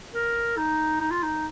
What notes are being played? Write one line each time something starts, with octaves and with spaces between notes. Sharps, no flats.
A#4
D#4
D#4
F4
D#4